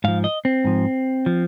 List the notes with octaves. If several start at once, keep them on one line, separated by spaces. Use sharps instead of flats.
G#2 F3 F5
D#5
C4
G#2 F3
F3